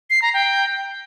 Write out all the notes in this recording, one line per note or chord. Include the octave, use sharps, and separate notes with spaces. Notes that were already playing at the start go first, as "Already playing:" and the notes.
C7
A#5
G5